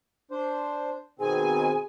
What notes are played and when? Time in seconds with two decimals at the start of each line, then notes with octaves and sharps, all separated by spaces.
0.31 D4 C5
1.19 B2 D#3 C4 G#4 G#5